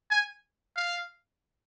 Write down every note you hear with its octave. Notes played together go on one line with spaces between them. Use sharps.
G#5
F5